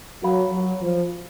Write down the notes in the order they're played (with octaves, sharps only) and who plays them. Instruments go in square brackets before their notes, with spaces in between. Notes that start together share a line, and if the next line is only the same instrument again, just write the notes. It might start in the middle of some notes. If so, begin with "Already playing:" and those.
[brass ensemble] F#3 [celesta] F#4 A#4 F5 B5
[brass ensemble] F#3
F3